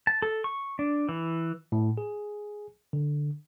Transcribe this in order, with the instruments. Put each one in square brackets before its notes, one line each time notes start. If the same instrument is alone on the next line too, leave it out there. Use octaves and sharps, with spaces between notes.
[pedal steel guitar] A5
A4
C#6
D4
E3
[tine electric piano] A2
G#4
D3